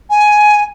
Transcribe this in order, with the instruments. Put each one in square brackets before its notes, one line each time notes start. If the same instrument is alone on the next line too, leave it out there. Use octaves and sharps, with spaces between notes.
[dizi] G#5